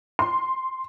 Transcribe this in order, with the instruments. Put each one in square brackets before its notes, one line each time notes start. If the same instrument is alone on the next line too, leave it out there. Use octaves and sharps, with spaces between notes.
[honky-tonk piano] C6